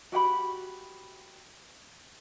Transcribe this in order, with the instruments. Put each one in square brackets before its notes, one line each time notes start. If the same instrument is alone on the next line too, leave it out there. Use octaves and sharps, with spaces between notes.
[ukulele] F#4 G4 F#5 B5